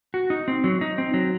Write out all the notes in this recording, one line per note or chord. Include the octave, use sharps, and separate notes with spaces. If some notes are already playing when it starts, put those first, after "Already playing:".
F#4
D#4
C4
F#3
D#4
C4
F#3